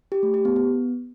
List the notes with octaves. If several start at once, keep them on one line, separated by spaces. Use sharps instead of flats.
G4
A3
G4
B3
B3